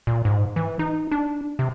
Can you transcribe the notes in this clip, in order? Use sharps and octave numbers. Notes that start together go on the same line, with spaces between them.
A#2
G#2
E3
D#4
D4
C3